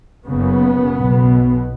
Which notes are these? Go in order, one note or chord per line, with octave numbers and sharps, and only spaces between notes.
F#1 F#2 C#3 B3
B1 B2